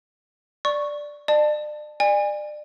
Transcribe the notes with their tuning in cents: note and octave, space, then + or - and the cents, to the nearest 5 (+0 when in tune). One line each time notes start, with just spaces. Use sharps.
D5 +0 C#6 -5
D5 +40 A5 +0
D5 +30 G#5 -25